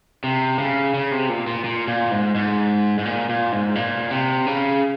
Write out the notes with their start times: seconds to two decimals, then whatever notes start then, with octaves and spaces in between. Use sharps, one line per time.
0.24 C3
0.59 C#3
0.94 C#3
1.12 C3
1.29 A#2
1.47 A#2
1.64 A#2
1.88 A#2
2.11 G#2
2.35 G#2
2.99 G#2
3.05 A#2
3.29 A#2
3.52 G#2
3.75 A#2
4.11 C3
4.47 C#3